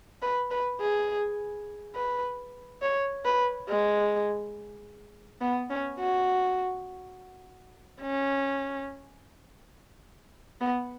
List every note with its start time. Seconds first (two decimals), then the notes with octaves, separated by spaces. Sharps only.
0.22 B4
0.51 B4
0.80 G#4
1.95 B4
2.82 C#5
3.25 B4
3.69 G#3
5.41 B3
5.70 C#4
6.00 F#4
8.01 C#4
10.61 B3